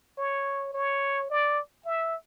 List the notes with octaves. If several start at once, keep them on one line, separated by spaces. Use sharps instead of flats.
C#5
C#5
D5
E5